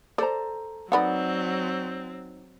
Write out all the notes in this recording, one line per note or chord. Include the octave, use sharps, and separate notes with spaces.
A4 C5 D5 A#5
F#3 A3 B3 C4 D#4 D5 F#5 B5